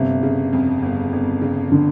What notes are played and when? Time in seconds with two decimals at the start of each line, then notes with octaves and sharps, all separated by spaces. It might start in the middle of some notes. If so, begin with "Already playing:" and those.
Already playing: G1 C3
0.23 C#3
0.53 F2
0.82 G1
1.12 G1
1.42 C#3
1.72 D3